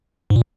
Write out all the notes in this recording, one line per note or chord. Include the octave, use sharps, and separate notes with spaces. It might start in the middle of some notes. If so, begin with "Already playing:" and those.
G#2
A#2